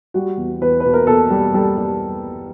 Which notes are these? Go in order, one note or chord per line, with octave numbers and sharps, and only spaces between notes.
G3 F#4
E2
E2 B4
B2 B4
A#4
B2 A4
G3
G3 A4
G3